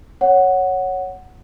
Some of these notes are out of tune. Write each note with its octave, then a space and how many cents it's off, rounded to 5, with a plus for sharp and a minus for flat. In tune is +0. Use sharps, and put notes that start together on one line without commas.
C#5 +0 F#5 +0